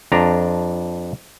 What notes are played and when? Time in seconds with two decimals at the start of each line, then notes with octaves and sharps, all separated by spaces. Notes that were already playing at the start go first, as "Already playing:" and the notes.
0.12 F2 D4 A#5